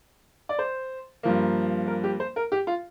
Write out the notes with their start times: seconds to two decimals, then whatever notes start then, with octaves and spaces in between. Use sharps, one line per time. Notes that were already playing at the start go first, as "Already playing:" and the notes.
0.49 D5
0.59 C5
1.23 G2 F3 A#3
1.87 A#4
2.04 G4
2.20 C5
2.36 A#4
2.52 G4
2.67 F4